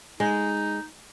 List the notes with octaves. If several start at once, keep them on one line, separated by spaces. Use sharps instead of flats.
G#3 D#4